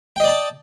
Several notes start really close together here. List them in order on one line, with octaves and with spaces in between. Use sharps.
G5 D#5 D5 A5